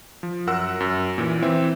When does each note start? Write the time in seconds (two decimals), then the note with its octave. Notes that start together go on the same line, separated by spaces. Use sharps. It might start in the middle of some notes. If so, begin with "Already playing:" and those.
0.23 F3
0.47 F#2 A#4 F#5 E6
0.80 F#2
1.18 A#2 E3
1.42 E3 C4 E5